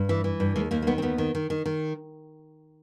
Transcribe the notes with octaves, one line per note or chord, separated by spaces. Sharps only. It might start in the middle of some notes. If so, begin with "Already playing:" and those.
Already playing: G2
E3
E3
G2
D#2 G#3
D#2 A#3
A#3
D#3 B3
C4
D#2 B3
D#3
D#3
D#3
D#3